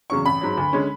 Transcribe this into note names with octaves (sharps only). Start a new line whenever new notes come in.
E2 C#3 F#3 C#6
A1 B5
G#2 F#3
D2
D3 G#3 C#4